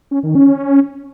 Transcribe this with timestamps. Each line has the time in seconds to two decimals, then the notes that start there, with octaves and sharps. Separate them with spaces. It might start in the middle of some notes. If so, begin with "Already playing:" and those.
0.11 C#4
0.23 D#3
0.35 C#4